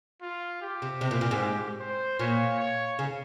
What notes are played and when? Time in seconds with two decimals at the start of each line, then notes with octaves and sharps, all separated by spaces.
0.22 F4
0.62 G4
0.82 C3
1.01 C3
1.11 A#2
1.21 A#2
1.31 G#2
1.80 C5
2.19 A#2 C#5
2.59 C#5
2.99 C#3